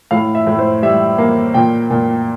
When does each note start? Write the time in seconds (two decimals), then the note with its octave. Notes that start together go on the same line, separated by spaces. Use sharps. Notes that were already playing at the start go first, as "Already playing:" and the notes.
0.11 A2 F5
0.35 E5
0.47 A2
0.59 C5
0.82 G3 E5
1.18 A#3
1.54 A#2 G5
1.90 A#2